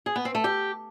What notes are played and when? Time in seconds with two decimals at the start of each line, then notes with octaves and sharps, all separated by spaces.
0.06 G#4
0.16 B3
0.25 C4
0.35 A3
0.44 G4